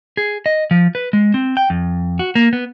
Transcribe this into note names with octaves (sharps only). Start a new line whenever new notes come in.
G#4
D#5
F3
B4
G#3
C4
G5
F2
F#4
A#3
B3